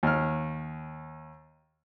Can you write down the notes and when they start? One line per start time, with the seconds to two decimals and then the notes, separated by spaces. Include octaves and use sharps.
0.03 D#2 F6